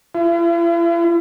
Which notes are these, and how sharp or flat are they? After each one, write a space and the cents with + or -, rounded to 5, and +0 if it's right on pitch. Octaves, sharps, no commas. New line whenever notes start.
E4 +45